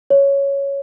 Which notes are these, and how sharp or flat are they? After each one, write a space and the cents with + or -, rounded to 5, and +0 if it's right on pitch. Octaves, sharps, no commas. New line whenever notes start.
C#5 +0